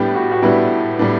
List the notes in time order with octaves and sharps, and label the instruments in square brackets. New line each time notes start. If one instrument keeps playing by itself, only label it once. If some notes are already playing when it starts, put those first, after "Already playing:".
Already playing: [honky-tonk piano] A2 G3 B3 D4 [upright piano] G4
[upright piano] F#4
F#4
[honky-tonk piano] A2 G3 B3 D4 [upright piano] E4
[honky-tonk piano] A2 G3 B3 D4